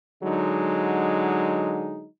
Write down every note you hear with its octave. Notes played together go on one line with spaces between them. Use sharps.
D3 F#3 G#3 D#4